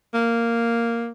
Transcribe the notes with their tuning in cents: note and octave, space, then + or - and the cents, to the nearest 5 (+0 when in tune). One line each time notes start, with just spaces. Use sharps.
A#3 -5